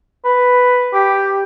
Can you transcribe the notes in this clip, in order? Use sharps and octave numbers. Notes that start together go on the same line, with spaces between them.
B4
G4